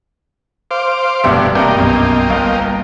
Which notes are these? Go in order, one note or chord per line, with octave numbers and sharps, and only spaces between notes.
C5 F5 D6
F1 G2 B2 G3 E5
G2 C3 A#3 D#5 G5 A#5
B1 F#2
G1 F5